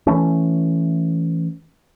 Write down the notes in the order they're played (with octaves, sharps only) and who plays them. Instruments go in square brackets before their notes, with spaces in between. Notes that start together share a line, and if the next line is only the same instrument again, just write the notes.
[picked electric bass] E3 A3 C#4